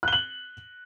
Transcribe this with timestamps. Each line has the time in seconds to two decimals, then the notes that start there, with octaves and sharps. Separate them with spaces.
0.03 F#6
0.08 G7
0.13 F#7